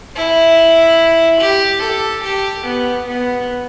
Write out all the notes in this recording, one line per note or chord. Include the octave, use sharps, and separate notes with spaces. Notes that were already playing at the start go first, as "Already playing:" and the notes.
E4
G4
A4
G4
B3
B3